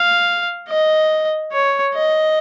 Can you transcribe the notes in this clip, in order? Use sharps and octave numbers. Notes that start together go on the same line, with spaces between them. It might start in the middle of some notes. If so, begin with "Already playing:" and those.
Already playing: F5
D#5
C#5
D#5